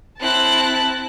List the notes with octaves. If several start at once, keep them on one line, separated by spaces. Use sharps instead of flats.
C4 E4 A5 F#6